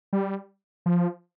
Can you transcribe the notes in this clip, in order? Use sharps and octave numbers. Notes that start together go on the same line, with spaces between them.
G3
F3